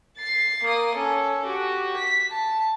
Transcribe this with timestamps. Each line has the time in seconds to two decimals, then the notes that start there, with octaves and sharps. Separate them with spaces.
0.18 A6 C7
0.64 A#3 D#6
0.95 C#4 A4
1.45 F#4 G4
1.96 B6
2.31 A5